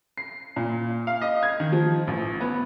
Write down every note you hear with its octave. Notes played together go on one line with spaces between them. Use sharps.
C7
A#2
F5
D#5
G#6
D#3
F3
A1
B3